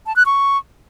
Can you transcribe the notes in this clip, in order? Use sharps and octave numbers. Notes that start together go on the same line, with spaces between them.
A5
F#6
C#6